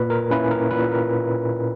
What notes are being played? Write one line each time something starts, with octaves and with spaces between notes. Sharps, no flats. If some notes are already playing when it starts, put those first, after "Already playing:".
Already playing: A#2 B4
A#4
A#3 C#4 E4 B4
A#4
A#2 B4
A#4